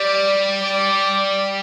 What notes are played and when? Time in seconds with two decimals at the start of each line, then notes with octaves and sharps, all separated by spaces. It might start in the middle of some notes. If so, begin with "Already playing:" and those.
Already playing: G3 D5
0.61 D5